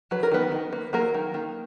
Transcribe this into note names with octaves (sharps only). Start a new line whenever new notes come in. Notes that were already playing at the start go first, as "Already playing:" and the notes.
F#3 B4
A#4
D#3 B3 B4
D#3
A#3
F#3 A#3 A#4
D#3
D#3